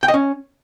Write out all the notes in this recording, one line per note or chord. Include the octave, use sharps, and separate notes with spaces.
G5
D#5
C#4